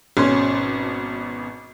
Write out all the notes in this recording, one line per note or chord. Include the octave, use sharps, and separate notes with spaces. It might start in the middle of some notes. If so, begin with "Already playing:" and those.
G#1 B2 C#4 C6